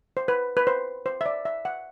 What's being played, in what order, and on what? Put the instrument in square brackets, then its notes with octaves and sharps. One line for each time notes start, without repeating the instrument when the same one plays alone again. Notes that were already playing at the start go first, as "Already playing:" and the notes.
[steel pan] C5
B4
B4
C5
C5
E5
D5
E5
F#5